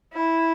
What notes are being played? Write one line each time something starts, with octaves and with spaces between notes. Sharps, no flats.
E4